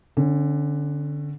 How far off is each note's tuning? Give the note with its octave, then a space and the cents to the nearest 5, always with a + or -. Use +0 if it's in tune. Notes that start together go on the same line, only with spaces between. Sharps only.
D3 +0 C#4 -35